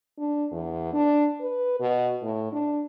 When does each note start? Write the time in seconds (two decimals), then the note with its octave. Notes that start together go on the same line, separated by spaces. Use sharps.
0.18 D4
0.52 E2
0.93 D4
1.41 B4
1.80 B2
2.22 A2
2.52 D4